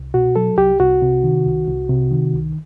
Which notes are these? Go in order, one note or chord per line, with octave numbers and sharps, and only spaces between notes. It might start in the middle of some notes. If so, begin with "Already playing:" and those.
Already playing: C2
B2 F#4
F#3 A4
C2 G4
C2 F#4
C3
D#3
C2
C2
C3
D#3
C2